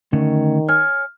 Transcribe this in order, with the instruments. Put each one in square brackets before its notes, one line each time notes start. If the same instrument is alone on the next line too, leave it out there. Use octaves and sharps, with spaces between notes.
[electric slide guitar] D3 A3 C#4 [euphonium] D#3
[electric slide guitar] C#5 G#5 [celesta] F6